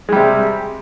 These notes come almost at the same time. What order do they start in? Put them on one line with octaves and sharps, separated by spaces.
G#3 G3 C3